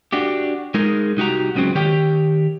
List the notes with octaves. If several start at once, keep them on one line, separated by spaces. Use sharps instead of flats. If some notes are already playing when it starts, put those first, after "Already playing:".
D4 F#4 G4
G#3 D#4 G#4 A#4
C2 D#4 F#4 G4 A#5
C#2 C#3 F#3 C4
D#3 G4 C#5 G5